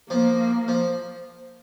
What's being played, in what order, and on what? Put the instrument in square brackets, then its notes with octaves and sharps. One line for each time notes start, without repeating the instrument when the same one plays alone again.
[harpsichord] F3 [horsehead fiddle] A#3
[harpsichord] F3